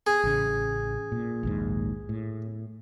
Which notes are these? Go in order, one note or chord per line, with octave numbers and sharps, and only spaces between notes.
G#4
A1 C#3
A#2
A#1 D#2 G#2
A2